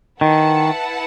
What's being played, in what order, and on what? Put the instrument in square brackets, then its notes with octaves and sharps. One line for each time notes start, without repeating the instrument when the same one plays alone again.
[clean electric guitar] D#3 [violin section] E4 B4 F#5 A5